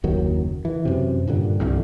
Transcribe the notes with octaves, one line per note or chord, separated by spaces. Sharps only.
F#1 D#2 D#3 F#3
E3
F#2 C3
G2 A#2 D3 G3
C2 G2 D3 E3